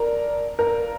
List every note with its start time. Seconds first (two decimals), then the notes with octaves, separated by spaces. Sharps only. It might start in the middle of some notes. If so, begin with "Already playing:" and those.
Already playing: D3 A3 D4 A#4
0.59 G3 A#3 F4 A4 A#4